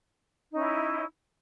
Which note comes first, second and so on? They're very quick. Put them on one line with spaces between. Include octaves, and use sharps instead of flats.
D#4 C#4 E4